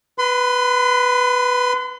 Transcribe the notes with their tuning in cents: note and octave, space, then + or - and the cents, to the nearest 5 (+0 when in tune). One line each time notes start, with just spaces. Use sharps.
B4 +0 C6 -40